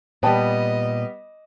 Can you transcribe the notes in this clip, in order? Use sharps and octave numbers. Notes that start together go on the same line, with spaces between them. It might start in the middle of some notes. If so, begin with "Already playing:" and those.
A#2 G3 B3 D#5 G5 A5